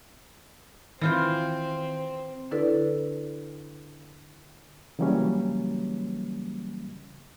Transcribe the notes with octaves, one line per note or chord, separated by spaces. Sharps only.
D#3 E3 C4 F4 C5
D3 D4 E4 A4 B4 D5
C#3 E3 F#3 G3 A#3 C#4